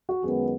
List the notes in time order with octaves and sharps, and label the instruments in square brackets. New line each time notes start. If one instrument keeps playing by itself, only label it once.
[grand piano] F#4
[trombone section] F#2 D#3 G#3 B3 [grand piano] G#4